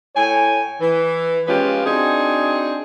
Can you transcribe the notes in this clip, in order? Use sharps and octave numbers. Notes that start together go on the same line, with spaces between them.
A2 C#5 G5 G#5
E3
F3 G#3 B3 C#4 F4 G4
C4 D4 D#4 F#4 G#4